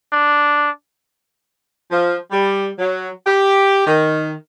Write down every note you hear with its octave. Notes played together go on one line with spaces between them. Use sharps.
D4
F3
G3
F#3
G4
D#3